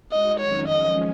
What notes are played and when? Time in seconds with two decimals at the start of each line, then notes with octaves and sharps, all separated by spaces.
0.12 G#3 D#4 F#4 D#5
0.40 F2 D#3 F#3 C#4 C#5
0.68 F3 G#3 C#4 D#5